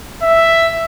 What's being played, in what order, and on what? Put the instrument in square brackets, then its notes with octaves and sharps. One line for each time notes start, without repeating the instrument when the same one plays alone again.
[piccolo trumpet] E5